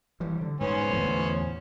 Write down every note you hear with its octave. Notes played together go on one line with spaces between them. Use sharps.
E3 G3
D3
G#2 B3 C#4 C5
E2 A2 D3